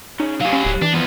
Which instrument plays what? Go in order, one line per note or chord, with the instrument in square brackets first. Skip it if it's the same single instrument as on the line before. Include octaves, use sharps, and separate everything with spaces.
[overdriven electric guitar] C#3 [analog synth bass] D#4
[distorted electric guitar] F#3 G#4 [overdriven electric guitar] G4 F5
[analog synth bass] C#4
D1
[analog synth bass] E3 [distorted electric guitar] D4
[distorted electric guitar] E2 F3 [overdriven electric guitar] B3